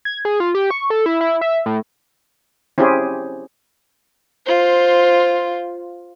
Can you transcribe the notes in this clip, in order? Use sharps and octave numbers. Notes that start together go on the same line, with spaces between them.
G#6
G#4
F4
G4
C#6
A4
E4
E4
E5
A2
C4 C#4 E4 G4 G#4
F4 C5